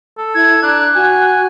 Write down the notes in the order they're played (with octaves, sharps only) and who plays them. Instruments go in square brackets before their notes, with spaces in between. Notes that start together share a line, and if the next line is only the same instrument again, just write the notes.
[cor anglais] A4
[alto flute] E4 [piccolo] G#6
[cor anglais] D4 [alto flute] A#5 [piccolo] F#6
[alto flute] F#4 [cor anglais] G#5